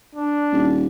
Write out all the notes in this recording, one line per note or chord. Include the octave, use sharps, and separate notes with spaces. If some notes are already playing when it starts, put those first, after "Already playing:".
D4
D#1